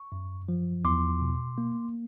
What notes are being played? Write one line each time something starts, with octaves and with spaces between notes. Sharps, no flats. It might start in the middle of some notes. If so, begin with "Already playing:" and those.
Already playing: C#6
F#2
F3
E2 C6 D6
B2
A#3